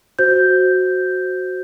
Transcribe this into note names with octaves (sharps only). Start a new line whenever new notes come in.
F#4 C5 G6